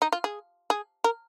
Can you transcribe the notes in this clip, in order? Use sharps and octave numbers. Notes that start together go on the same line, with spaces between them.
D#4
F4
G#4
G#4
A#4